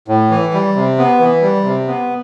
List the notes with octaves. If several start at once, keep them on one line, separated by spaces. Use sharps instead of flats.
A2
E3
G3
C3
B3
E3
G3
C3
B3